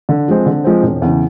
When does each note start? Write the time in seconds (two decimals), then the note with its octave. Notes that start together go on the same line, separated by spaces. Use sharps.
0.09 D3
0.28 F3 G#3 C4
0.46 D3
0.64 F3 G#3 C4
0.83 E1
1.02 E2 C#3